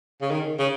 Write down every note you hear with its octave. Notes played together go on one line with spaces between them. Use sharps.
C#3
D#3
C#3